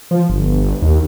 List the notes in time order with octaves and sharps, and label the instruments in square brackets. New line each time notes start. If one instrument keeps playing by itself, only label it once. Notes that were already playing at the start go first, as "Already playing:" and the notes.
[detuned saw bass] F3
G1
D#2